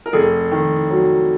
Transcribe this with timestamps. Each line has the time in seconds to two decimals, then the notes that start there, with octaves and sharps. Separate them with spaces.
0.06 A#4
0.13 F1 G#4
0.52 D#3
0.90 F#3